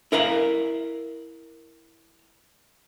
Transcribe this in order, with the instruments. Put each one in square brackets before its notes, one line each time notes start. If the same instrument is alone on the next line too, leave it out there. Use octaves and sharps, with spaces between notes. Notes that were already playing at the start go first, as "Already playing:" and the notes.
[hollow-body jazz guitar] E4 A#4 F5 B5